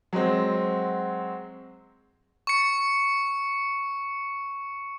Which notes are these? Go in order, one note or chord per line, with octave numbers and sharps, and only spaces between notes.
F#3 G#3 C4
C#6 C#7